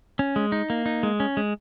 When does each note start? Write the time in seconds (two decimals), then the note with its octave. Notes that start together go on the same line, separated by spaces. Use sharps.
0.19 C#4
0.36 G#3
0.52 D#4
0.70 A#3
0.86 D#4
1.03 G#3
1.20 C#4
1.37 G#3